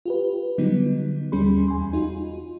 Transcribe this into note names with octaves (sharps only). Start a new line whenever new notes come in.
F4 G4 B4
D3 F#3 G3 B3 D#4
D#2 G3 C#4 G#4 B5 C6
E2 G#5 C6
D#4 F4 F#4